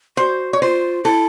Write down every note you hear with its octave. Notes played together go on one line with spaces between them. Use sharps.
F#4 C5
C#5
F4 C5
E4 A4